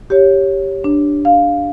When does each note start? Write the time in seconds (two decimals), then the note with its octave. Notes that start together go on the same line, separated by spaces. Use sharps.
0.10 G4 C#5
0.84 D4
1.25 F5